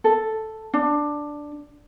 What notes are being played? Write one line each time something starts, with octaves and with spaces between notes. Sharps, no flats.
A4
D4